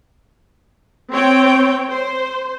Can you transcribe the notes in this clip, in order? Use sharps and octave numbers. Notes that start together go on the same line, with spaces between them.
C4 C#5 G5
C5